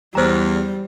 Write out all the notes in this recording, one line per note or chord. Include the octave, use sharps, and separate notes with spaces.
E2 G3 C5 A#5